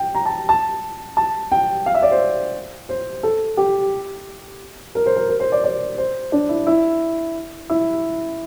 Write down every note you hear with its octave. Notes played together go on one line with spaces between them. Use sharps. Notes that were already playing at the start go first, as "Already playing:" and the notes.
Already playing: G5
A#5
A5
A5
A5
G5
F5
E5
D5
C5
C5
A4
G4
A#4
C5
A#4
A#4
C5
D5
D5
C5
D4
E4
E4
E4